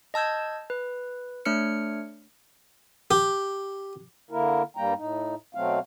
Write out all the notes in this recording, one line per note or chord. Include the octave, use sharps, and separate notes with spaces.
D#5 A5 E6 G6 G#6
B4
A3 D4 C#5 F6 C#7
G4
D3 A#3 E4 A#4
G2 G3 A#3 G5 A#5
A2 D#4
B2 F#3 A3 C4 F5